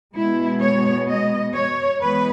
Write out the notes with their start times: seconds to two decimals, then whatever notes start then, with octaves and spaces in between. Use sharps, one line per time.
0.14 B2 G#3 B3 E4
0.61 C#5
1.08 D#5
1.54 C#5
2.00 E3 G#3 B3 B4